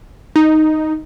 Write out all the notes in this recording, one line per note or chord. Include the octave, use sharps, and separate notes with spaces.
D#4